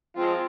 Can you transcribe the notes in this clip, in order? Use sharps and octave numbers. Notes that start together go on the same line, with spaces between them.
F3 G#3 C4 F4